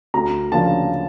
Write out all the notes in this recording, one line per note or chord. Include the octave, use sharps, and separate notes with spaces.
D2 A#5
C#3 F3 A#3 D4 A5